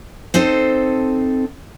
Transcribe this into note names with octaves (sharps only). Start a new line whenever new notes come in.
C4 D#4 A4 C5